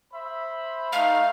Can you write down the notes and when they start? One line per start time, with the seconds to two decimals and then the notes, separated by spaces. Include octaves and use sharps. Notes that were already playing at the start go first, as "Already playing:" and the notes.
0.13 C5 E5 B5
0.92 A3 D#4 F5